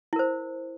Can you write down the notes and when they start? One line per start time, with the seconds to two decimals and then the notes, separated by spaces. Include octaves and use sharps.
0.13 E4
0.16 A#4
0.19 C5